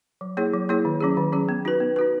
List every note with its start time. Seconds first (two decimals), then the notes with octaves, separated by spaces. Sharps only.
0.21 F#3
0.37 A#3 E4 G#4 C#5
0.54 F#3
0.69 A#3 E4 G#4 C#5
0.85 D#3
1.00 F#3 C#4 G#4
1.17 D#3
1.32 F#3 C#4 G#4
1.49 B3
1.65 D#4 F#4 B4
1.80 B3
1.96 D#4 F#4 B4